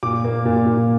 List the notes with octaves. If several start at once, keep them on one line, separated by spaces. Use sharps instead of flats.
A#2 D6
A#3
A#2
A#2